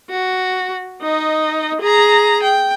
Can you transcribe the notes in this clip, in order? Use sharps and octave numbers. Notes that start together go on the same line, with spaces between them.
F#4
D#4 D#5
G#4 A#5
G5